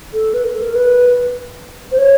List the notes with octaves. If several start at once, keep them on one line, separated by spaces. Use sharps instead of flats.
A4
B4
A#4
A4
A#4
B4
C5
C#5